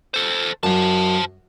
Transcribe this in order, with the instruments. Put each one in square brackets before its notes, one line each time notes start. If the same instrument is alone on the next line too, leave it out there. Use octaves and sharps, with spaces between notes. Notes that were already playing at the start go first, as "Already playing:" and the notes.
[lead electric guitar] A4 C5
[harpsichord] F#2 [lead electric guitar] C5 A5